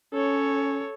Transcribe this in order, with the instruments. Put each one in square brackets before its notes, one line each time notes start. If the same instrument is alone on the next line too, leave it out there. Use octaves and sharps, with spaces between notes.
[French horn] C#4 [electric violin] A4 C#5